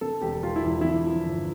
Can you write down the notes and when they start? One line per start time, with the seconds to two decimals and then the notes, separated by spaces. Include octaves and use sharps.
0.01 D3 A4
0.22 E1 G4
0.43 E1 F4
0.56 E4
0.63 E2
0.81 D3 E4
1.05 F3
1.25 G1